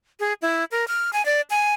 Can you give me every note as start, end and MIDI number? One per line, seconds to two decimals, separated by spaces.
0.20 0.33 68
0.42 0.64 64
0.72 0.88 70
0.88 1.11 89
1.13 1.24 80
1.26 1.41 74
1.50 1.74 80